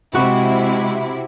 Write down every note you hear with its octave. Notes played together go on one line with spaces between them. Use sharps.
C3 G#3 E4 F#4 D#5